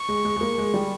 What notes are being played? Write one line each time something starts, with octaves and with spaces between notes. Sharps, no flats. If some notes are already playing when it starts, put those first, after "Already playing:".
Already playing: C#6
G#3
G#3
G#3
A#3
G#3
G3